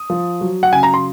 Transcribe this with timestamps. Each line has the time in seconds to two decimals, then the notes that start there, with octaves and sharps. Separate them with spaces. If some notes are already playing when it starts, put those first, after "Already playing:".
Already playing: D#6
0.10 F3
0.41 F#3
0.63 F#5
0.72 C#3 G#5
0.83 A#5
0.94 C6